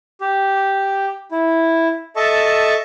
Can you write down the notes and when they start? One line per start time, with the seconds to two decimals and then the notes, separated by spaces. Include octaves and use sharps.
0.21 G4
1.32 E4
2.16 A4 D#5 E5 A5 C#6